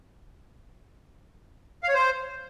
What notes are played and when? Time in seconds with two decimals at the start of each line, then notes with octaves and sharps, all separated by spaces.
1.83 F5
1.89 C#5
1.94 C5